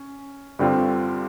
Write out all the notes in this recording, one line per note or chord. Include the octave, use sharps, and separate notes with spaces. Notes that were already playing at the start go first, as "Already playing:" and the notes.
Already playing: C#4
G2 D3 G3 C4 F4